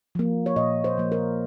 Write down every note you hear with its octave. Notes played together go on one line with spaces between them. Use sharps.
F3 A#3
C#5
A#2 D#5
C5
F3 A#3
A#4